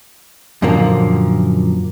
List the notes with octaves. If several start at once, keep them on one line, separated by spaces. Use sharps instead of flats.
F#2 A#2 D3 F3 A#3